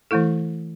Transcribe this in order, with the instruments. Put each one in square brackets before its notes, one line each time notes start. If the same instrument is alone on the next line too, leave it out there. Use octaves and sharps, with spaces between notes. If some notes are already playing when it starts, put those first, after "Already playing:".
[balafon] E3 A3 E4 A4